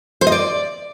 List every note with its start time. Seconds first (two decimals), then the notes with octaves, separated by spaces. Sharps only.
0.21 C5
0.27 D#5
0.32 D5